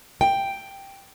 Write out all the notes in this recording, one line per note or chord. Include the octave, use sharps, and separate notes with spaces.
G5